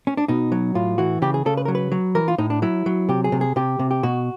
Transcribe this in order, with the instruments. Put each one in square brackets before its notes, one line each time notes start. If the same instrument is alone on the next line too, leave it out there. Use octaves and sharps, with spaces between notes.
[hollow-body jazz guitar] C#4
D4
B2 D#4
F#3
A2 F4
E3 F#4
C#3 G4
G#4
C#3 A4
B4
F#3 A#4
B4
F#3
E3 A#4
F4
A2 D#4
D4
F#3 E4
F#3
C3 G4
G#4
C3
G#4
C3 G4
C3
G4
B2 F#4